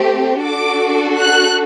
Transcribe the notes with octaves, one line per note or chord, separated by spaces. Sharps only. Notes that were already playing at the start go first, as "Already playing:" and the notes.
Already playing: A3 C4 G4
D4 F#4 A4 D6
F#6